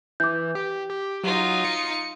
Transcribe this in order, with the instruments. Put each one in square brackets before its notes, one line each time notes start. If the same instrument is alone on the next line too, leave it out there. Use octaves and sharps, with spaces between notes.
[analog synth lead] E3 [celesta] D6 G6
[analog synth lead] G4
G4
[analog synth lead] F#3 [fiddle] D#4 F4
[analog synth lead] C#7